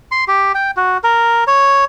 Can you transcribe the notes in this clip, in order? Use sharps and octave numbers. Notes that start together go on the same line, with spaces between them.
C6
G4
G5
F#4
A#4
C#5